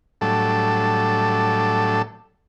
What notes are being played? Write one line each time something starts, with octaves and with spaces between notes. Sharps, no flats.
A2 F#3 G3 A3 D4 A4